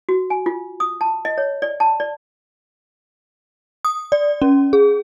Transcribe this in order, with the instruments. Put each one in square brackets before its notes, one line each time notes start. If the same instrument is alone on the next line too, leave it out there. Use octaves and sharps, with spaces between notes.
[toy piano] F#4
G#5
F4
D#6
A5
D#5
C#5
D5
A5
D5
[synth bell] D#6
D5
C#4
G#4